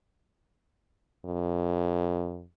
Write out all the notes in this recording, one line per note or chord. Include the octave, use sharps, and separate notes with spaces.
F2